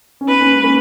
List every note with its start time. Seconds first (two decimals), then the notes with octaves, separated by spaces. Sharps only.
0.21 C#4
0.28 B3 D#4 B4
0.40 A#3 C#4
0.52 G#3 B3
0.64 A#3 C#4